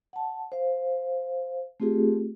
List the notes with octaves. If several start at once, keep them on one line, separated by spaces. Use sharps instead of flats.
F#5 A5
C5 F5
A3 C4 F4 G4 G#4